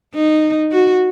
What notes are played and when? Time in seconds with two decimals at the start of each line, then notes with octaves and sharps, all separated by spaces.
0.14 D#4
0.71 F#4